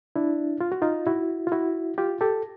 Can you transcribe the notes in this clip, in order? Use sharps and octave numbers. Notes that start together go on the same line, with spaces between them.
D4 E4
F4
F#4
D#4 F4
E4 F#4
F4
E4 F#4
F4 G4
G4 A4